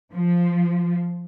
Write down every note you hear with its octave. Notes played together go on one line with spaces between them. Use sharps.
F3